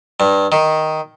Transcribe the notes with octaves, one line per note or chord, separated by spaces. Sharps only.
G2
D#3